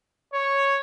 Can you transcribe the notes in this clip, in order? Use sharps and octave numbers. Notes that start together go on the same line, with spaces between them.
C#5